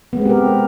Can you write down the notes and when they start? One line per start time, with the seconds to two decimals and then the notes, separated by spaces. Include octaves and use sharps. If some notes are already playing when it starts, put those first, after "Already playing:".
0.13 B3
0.17 G#3
0.21 C4
0.25 G4
0.30 A#4